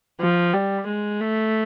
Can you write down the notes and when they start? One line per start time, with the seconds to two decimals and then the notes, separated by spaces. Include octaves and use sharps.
0.20 F3
0.54 G3
0.88 G#3
1.21 A3